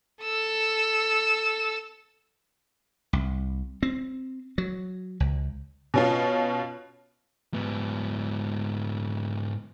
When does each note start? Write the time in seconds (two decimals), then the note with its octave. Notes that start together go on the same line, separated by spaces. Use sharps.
0.22 A4 E6
3.13 C2
3.83 C4
4.58 F#3
5.20 C#2
5.94 B2 C#4 F4
7.54 G#2 B3